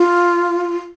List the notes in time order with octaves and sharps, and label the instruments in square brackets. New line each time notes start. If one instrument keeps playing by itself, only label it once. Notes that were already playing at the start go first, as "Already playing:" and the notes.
Already playing: [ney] F4